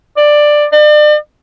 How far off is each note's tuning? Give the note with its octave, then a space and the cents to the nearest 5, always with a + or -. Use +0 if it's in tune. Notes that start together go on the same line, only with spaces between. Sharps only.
D5 +10
D5 +40